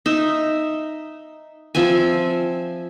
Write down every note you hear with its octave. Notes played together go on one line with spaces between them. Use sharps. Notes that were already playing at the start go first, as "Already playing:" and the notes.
D#4 E5
F3 C4 E5 G#5